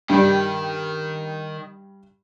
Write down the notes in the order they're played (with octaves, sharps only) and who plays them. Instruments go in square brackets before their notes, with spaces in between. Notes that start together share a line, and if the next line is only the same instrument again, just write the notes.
[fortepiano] G2 G3 [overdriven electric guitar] D#3